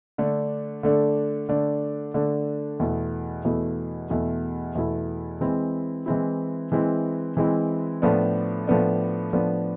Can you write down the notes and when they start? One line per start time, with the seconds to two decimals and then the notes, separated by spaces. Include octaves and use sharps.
0.18 D3 A3 D4
0.83 D3 A3 D4
1.49 D3 A3 D4
2.14 D3 A3 D4
2.80 E2 B2 A3 E4
3.45 E2 B2 A3 E4
4.10 E2 B2 A3 E4
4.75 E2 B2 A3 E4
5.41 E3 G#3 C4 E4
6.06 E3 G#3 C4 E4
6.72 E3 G#3 C4 E4
7.37 E3 G#3 C4 E4
8.02 A2 F3 B3 D4
8.67 A2 F3 B3 D4
9.33 A2 F3 B3 D4